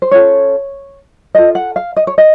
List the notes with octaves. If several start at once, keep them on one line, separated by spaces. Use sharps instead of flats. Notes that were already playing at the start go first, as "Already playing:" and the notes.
C5
C#4 F4 A4 C#5
F4 A4 D#5
F#5
F5
D#5
C#5
D#5